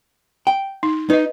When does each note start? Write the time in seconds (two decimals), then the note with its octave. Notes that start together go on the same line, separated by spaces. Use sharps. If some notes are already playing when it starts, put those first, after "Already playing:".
0.47 G5
0.83 D#4
1.10 D#4 B4 D#5